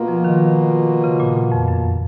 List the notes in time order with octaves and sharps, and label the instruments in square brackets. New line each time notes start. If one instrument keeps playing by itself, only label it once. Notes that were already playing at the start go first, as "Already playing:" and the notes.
Already playing: [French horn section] B2 A#3 F4
[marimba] F3
D#3
C#3
A#2
F2
F#2